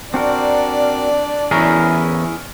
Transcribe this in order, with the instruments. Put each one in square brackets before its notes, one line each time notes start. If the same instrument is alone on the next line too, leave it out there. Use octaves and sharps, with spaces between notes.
[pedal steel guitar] C4 F#4 A#4 [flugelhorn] D4 [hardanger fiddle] D5
[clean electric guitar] E2 C#4 A#4 [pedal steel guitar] E4 G#4